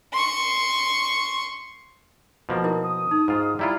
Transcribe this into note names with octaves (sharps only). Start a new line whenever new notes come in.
C6 C#6
B2 F3 A#3
E4 A#4
D#6
D#4
G#2 F4
G3 E4 F4 A#5